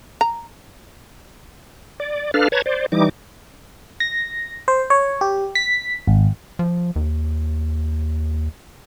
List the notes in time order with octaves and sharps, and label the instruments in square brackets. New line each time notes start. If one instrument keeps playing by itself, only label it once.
[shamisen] A#5
[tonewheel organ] D5
D4 A4 B4 F5 F6
B4 C#5 A5 A#5 G#6
C5 D5
E3 G3 D#4 D6
[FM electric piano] A#6
C5
C#5
G4
B6
G#1
[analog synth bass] F3
D#2